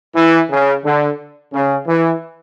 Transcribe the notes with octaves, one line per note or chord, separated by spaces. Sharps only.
E3
C#3
D3
C#3
E3